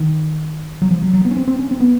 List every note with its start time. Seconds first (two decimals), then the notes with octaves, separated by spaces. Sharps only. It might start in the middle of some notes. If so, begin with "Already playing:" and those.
Already playing: D#3
0.82 F#3
0.91 F3
1.02 F#3
1.13 F#3
1.25 B3
1.31 C#4
1.37 C4
1.48 C4
1.59 C#4
1.71 C4
1.80 B3